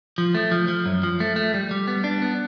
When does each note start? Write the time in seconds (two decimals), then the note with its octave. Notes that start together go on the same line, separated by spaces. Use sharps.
0.18 F3
0.35 A3
0.51 F3
0.68 F3
0.86 F#2
1.03 F3
1.20 A3
1.36 A3
1.54 G3
1.71 G3
1.87 B3
2.04 D4
2.22 B3